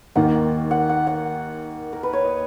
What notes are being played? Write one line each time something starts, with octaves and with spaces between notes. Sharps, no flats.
D#2 D#3 A#3 F#5
F#5
F#5
F#5
A#4
B4
C#5
D#5